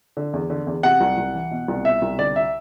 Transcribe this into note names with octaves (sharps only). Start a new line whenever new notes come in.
D3
E2
D3
E2
C3 F#5
C2
C2
E3
B2
C2
B2 E5
C2
D3 D5
E5